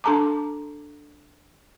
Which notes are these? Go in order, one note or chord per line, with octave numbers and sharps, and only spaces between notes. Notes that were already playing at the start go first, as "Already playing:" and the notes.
D4 A4 A5 A#5 D6